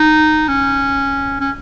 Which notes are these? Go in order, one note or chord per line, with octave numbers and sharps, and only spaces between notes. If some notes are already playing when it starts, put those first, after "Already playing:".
Already playing: D#4
C#4
C#4